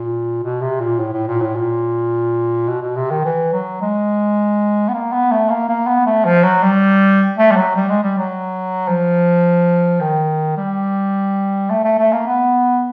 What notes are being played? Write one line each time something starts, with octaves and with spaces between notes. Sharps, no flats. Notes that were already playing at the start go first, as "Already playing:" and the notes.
Already playing: A#2
B2
C3
A#2
A2
A2
A#2
A2
A#2
B2
B2
C3
D#3
E3
F#3
G#3
B3
A#3
B3
A3
A#3
A#3
B3
A3
F3
F#3
G3
A3
G3
F#3
G3
G#3
G3
F#3
F3
D#3
G3
A3
A3
A3
A#3
B3